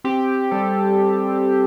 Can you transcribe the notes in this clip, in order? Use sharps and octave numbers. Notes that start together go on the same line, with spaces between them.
C4 G4
G3 A4